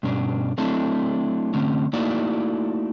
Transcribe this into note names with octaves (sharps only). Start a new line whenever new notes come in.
G2 B2 C#4 D4
F#3 A3 C4 D4 E4
D3 A3 C4 C#4
A3 A#3 D#4 E4 F#4 D5